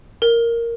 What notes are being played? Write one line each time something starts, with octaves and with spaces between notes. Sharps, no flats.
A#4